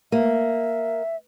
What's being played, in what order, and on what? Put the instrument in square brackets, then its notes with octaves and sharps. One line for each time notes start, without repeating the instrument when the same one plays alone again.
[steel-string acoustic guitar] A#3 [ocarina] E5